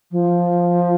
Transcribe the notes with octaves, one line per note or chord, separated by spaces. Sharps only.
F3